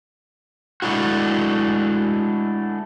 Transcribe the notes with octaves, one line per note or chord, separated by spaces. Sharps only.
G#3 A3 D4 E4 F#4